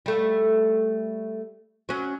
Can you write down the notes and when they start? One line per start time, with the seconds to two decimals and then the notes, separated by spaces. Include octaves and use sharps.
0.06 G3 A3
1.89 F#3 C#4